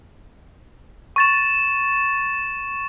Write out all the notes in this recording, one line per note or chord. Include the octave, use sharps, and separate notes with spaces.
C#6 A6 E7